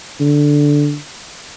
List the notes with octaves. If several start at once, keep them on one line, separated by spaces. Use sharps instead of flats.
D3